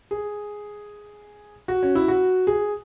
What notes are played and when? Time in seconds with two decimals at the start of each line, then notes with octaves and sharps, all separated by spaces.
0.11 G#4
1.68 F#4
1.83 C#4
1.95 E4
2.08 F#4
2.47 G#4